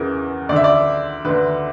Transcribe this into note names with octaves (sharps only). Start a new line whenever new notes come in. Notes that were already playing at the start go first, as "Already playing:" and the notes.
Already playing: E2 C#3 E3 A#4
D2 D3 D5 E5
D5
D2 D3 B4